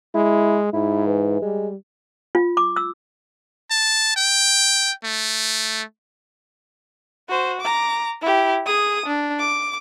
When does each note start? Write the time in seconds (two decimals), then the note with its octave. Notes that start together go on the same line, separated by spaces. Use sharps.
0.15 G#3 E4
0.73 G#2 E4
1.07 E3
1.42 G3 G#3
2.35 F4
2.57 D6
2.76 E6
3.70 A5
4.16 G5
5.04 A3
7.29 F#4 C5
7.61 A#5 D6
8.22 E4 G4
8.66 G#4 D#6
9.06 D4
9.40 D6